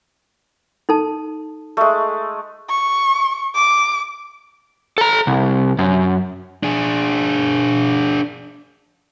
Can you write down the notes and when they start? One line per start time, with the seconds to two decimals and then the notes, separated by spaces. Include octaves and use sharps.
0.89 D#4 A4 A5
1.77 G#3 A3
2.69 C#6
3.55 D6
4.98 A4 A#5
5.27 C2
5.79 F#2
6.63 D4 G#4